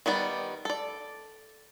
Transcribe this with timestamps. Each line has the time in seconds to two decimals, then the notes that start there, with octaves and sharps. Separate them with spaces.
0.06 D#3 G3 B3 D5
0.65 A4 D5